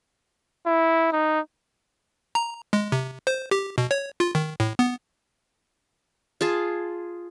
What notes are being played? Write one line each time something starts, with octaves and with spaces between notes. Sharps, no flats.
E4
D#4
A#5
G#3
C3
C5
G4
B2
C#5
F4
D#3
A2
B3
F4 G#4 A5